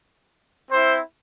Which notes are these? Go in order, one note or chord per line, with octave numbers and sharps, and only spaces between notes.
C4 E4 C5